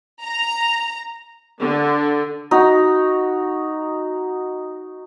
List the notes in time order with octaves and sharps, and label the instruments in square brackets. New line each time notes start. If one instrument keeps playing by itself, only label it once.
[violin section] A#5
[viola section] D3
[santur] D#4 F#4